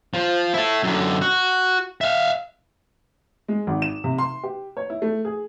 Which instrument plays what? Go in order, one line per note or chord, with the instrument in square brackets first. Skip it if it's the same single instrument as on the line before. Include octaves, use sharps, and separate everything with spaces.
[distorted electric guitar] F3
E4 A4
F#2 D3
F#4
E5 F5
[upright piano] G#3
G#1
E7
C3
C6
G4
C#5
E4
A3
G#4